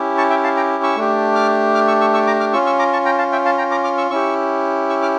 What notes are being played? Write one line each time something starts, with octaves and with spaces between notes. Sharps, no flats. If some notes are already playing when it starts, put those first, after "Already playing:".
Already playing: C#4 E4 G4
A5 C#6
E5 G5
F5 A5
G5 A#5
C#6 E6
A3 D4 G4
D6 F6
D6 F6
C#6 E6
C#6 E6
C#6 E6
A#5 D6
D6 F6
C#4 F4 C#6 E6
C#6 E6
A#5 D6
A5 C#6
G5 A#5
F5 A5
E5 G5
F5 A5
G5 A#5
A#5 D6
D6 F6
C#6 E6
C#4 E4 G4 C#6 E6
C#6 E6
D6 F6